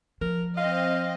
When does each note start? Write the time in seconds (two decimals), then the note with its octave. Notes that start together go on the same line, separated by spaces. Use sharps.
0.21 F3 A#4
0.57 C4 D#5 F5